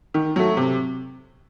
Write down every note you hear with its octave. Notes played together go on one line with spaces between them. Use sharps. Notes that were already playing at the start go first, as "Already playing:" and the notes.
D#3
F#3 A3
C3